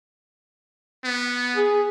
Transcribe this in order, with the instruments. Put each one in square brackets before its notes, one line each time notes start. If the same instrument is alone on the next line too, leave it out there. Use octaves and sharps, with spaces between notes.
[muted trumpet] B3
[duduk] G#4